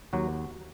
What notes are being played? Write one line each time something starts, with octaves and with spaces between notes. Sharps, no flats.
D#2 F#3 F#4